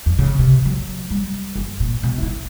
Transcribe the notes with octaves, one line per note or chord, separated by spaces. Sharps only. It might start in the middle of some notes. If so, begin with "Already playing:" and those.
F2
C#3
C3
F#3
G3
G1
A#2
B2
E4